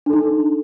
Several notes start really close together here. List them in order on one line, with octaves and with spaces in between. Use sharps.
D4 A4 D#4